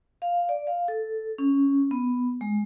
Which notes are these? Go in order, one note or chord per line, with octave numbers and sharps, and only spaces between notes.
F5
D5
F5
A4
C#4
B3
G#3